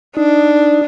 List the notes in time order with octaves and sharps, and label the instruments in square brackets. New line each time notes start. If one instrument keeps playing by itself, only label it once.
[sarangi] D4 [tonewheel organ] D#4